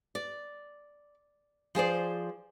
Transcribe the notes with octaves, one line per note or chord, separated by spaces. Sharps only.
D5
F3 G#4 C5 D5